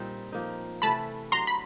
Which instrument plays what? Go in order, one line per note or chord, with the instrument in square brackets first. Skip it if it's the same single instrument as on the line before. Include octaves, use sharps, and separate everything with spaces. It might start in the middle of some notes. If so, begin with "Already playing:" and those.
Already playing: [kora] A#2 G3 C4 D#4
F3 A#3 D#4
[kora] C3 E3 A3 [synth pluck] A5 B5
[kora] F#3 B3 D4 [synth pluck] A#5 C6
[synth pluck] B5